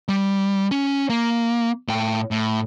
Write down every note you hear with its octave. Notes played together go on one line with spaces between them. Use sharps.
G3
C#4
A#3
A2 G5
A2